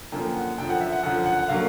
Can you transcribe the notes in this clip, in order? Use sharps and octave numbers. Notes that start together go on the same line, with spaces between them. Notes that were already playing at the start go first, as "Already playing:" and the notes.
F#2 D3 F3 A#3 G5
F#5
F#2 D3 F3 G5
F#5
E5
F#5
F#2 D3 F3 F#5
F#5
F#5
D3 F#3 A#3 F5